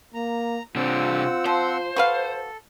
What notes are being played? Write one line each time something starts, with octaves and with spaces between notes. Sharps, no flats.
A#3 A#5
C3 C4 D4 F4 F#5 E6
F3 C5
F#4 A4 B4 F5